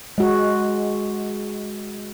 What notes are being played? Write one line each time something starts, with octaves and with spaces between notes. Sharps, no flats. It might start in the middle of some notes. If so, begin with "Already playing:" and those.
G#3 F#4